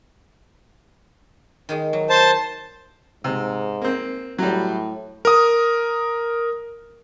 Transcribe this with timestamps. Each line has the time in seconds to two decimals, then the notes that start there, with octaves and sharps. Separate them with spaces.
1.69 D#3 G#3 G#4
1.93 F#3
2.09 C5 A5
3.24 G#2 C3
3.82 A#3 C4
4.38 A2 F#3 G3
5.25 A#4 D#6